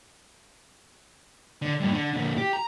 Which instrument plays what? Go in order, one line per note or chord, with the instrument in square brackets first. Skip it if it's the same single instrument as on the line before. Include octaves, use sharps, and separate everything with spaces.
[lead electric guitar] D3
G2 A#2
D3
A#2 D3
G4
A#5